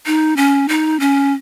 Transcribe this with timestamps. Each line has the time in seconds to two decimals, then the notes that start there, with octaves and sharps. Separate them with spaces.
0.06 D#4
0.37 C#4
0.69 D#4
1.00 C#4